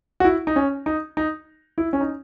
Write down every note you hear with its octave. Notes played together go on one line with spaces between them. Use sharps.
F#4
E4
D#4
C#4
D#4
D#4
E4
C#4
D#4